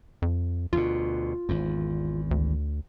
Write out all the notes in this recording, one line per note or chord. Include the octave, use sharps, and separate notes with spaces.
F2
D2 B2 F4
G#1 E2
D2